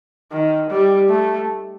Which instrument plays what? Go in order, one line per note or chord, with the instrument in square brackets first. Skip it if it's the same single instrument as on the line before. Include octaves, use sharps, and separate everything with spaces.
[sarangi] D#3
G3
A3